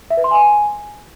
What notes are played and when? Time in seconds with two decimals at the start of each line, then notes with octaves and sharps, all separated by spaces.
0.10 E5
0.17 B4
0.24 C6
0.31 G#5